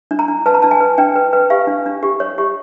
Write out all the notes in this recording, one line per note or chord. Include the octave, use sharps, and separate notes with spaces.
D4
A#5
D4
B4 A5
A#5
D4 A5
G#5
B4
D4 G5
B4
B4
G4 F5
D4
D4
G4
C#5
G4